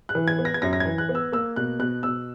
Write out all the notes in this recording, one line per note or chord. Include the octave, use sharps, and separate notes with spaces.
F#6
E3
G#6
B3
A#6
G#6
F#2 A#6
A#6
G#6
E3
F#6
B3
E6
A#3 E6
B2 F#6
B2 F#6
B2 E6